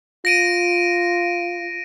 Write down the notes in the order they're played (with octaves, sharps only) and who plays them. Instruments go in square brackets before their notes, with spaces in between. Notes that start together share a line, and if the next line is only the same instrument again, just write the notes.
[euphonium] F4 [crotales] A#6 D7 D#7